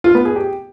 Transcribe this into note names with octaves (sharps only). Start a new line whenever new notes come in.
F4
B3
G#4
G4